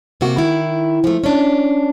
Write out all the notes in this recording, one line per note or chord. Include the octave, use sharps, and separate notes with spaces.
C3 A#3 F#4
D#3 E4
F3 A3
C#4 D4